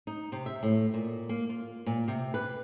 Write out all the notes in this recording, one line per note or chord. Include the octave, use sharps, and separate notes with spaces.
D#4
C3
E5
A2
A#2
A#3
F4
A#2
C3
B4